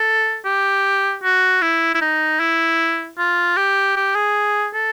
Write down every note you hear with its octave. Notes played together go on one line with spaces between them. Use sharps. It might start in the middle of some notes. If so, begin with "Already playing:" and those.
Already playing: A4
G4
F#4
E4
E4
D#4
E4
F4
G4
G4
G#4
A4